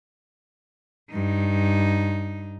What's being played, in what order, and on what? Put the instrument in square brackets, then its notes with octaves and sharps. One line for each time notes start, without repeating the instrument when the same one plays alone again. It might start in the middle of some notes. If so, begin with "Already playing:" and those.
[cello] G2 D#4